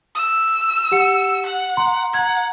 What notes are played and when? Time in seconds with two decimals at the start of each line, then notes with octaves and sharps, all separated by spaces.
0.15 E6
0.92 G4 F#5 C#7
1.46 F#5
1.77 A#5 C6
2.14 F#5 A#5 G#6